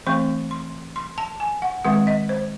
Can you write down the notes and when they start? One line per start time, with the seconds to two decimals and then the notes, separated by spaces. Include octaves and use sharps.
0.07 E3 A3 C4 C#6
0.51 C6
0.96 C6
1.18 A5
1.40 G#5
1.62 F#5
1.85 D#3 G#3 C4 F#5
2.07 D#5
2.29 C5